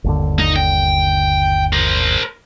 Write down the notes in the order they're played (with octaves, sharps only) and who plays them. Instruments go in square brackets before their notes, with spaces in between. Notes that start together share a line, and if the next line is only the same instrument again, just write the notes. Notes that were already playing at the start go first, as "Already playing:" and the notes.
[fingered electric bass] G1 D#2 D3
[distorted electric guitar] D#4
G5
A#4 C5